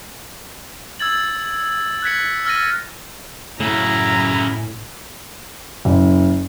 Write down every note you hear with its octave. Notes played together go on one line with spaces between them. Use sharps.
E6 G#6 A6 F#7
F#6 G#6 B6 C#7
E6 F6 A6 A#6 D#7
F#2 A2 C#3 E4 A#5
F#1